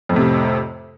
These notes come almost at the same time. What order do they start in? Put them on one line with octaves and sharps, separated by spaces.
F2 A2 C3